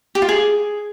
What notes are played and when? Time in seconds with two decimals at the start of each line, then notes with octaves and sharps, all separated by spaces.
0.15 G4
0.22 F4
0.29 G#4